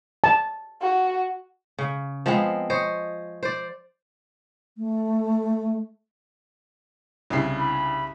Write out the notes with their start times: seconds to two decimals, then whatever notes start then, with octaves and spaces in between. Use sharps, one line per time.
0.24 A5
0.81 F#4
1.78 C#3
2.26 F3 G#3 B3 C4
2.70 C5 C#5 D#5
3.43 C5 D5
4.76 A3
7.30 C2 C#3 D4 E4 C7
7.58 B5